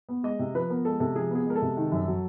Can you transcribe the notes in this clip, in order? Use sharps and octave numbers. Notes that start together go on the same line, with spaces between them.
B3
G#3 D#5
C3
F3 B4
B3 A#4
G#3 A4
C3 A4
F3 G#4
B3 G#4
G#3 A#4
A4
C3
D#3
F#2
F#3